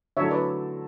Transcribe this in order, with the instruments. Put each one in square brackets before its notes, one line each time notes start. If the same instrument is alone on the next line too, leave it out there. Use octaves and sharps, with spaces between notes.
[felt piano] D3 F#3 A3 E4 A4 [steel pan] C#5 E5
[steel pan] B4 D5